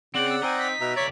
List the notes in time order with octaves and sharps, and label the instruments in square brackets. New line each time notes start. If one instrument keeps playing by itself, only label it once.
[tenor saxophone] C#3 [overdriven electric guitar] C4 G5 [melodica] D5 F#5 [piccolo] F#7
[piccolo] E6
[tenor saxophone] C4 [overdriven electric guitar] D#4 [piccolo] G#5
[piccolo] B6
[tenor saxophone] B2 [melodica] E5 A#5
[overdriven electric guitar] C#2 D5 [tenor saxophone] C#5 [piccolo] B6